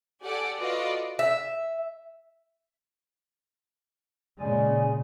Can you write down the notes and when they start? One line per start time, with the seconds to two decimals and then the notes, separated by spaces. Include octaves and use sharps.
0.22 G4 A4 D5 F#5 G#5 D6
0.59 F4 F#4 A4 B4 D5 D#5
1.19 E5
4.40 A#2 C#3 G#3 G#4 D5 G#5